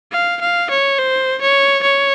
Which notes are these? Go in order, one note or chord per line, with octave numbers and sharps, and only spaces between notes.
F5
F5
C#5
C5
C#5
C#5